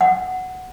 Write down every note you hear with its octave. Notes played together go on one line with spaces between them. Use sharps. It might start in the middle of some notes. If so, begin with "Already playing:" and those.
F#5